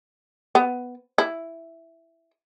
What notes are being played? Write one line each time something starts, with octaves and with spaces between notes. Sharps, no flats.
B3
E4